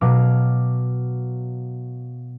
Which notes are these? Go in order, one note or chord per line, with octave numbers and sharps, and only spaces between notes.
B2 F#3 F5 D6